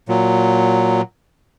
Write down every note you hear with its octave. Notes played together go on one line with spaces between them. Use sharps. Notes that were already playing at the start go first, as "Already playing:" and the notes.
A#2 F#3